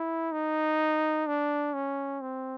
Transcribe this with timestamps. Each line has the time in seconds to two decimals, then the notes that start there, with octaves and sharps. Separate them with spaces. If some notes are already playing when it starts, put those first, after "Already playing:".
Already playing: E4
0.32 D#4
1.27 D4
1.74 C#4
2.21 C4